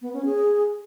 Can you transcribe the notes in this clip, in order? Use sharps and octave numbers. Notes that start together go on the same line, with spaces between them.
B3
C#4
G#4